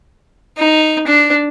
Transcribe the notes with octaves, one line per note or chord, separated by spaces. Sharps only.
D#4
D4